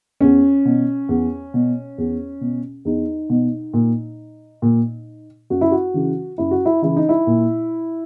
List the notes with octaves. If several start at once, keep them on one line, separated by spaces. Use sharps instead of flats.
E2 C#4
B2
E2
B2
E2
B2
E2 D#4
B2
A#2
A#2
F#2 F#4
E4
F#4
C#3 E3
F#2 E4
F#4
E4
C#3 E3 E4
D#4
E4
A#2